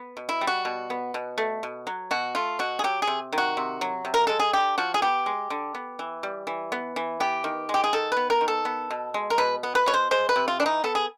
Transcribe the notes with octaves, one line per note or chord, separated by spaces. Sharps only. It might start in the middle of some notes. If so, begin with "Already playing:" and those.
Already playing: B3
B2
E4
G3
F#4
B2
B3
B2
A3
B2
F#3
B2 F#4
A3 F4
B2 F#4
G#4
F#3 G4
G#4
C3
D#3
F#4
C3
F#3
C3
A#4
G#3 A4
G#4
D3 G4
F3 F#4
G#4
B3 G4
G#3
D3
B3
E3
G3
E3
B3
E3
B3 G4
D#3
G#3
G4
G#4
D#3 A4
B3 B4
A#4
D#3
A4
B3
B2
G#3
A#4
B2 B4
B3
B4
B2 C#5
C5
G#3 C5
B4
C3
F4
E3 D4
D#4
B3 A4
G#4